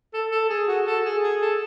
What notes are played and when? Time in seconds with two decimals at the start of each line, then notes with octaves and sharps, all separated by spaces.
0.13 A4
0.31 A4
0.49 G#4
0.68 F#4
0.86 A4
1.05 G#4
1.23 G#4
1.41 A4